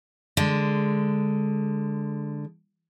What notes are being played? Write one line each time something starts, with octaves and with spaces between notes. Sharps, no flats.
D3 G#3